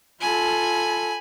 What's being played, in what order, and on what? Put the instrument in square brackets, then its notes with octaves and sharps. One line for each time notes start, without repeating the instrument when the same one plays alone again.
[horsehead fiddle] F4 A4 [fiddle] G#5 B5